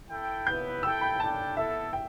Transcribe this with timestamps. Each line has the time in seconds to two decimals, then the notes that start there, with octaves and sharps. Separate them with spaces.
0.10 E4 A4 G5
0.47 B3 E4 B4 G6
0.83 E4 A4 G5 E6
1.01 B5
1.20 D4 A4 G5 A5
1.57 B3 E4 A4 E5
1.93 G5